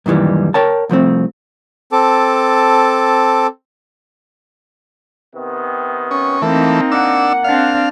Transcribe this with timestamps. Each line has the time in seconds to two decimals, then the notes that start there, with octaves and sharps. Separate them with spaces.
0.06 F#2 A#2 D#3 E3 G3
0.54 A#4 C#5 G5 A5
0.89 C2 F3 A3 C4
1.92 C4 A4 A5 D6
5.36 C3 D#3 B3
6.11 C#4
6.42 E3 A3 A#3 C4 D#4
6.92 D4 F#5 E6
7.44 C4 D4 F5